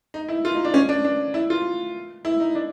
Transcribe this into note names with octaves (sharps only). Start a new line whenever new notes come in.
D#4
E4
F4
D#4
D4
C#4
D4
D4
E4
F4
E4
D#4
D4